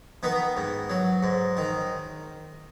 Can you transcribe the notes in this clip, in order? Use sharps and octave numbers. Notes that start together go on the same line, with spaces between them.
D#3 B3
G#2
F#3
G#2
D#3